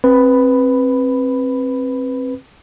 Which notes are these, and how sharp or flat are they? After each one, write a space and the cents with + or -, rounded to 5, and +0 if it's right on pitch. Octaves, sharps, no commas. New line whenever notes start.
C4 +25 B4 +0 B5 +10